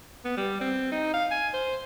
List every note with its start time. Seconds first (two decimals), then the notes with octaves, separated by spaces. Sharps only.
0.25 B3
0.37 G3
0.61 C4
0.92 D#4
1.14 F5
1.31 G#5
1.54 C5